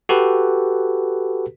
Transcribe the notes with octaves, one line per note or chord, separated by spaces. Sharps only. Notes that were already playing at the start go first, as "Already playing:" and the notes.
F#4 G4 A4 B4